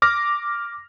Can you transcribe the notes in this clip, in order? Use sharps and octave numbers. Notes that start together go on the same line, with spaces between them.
D6 F6 A#6